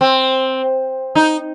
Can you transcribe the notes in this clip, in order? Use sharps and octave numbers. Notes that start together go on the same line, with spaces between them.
C4
D#4